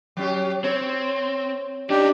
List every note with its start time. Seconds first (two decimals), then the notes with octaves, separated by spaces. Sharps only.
0.17 F#3 C#4 G4
0.64 C4 C#5
1.90 D4 D#4 G4